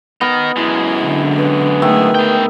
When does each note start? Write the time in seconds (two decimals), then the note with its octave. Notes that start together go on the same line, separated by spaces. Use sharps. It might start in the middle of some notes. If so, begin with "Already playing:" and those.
0.21 B3 D#4 A#4
0.56 F#2 G#3 E4
1.03 D3
1.38 B4
1.82 D#3 A3 G#4 E5
2.15 B3 G5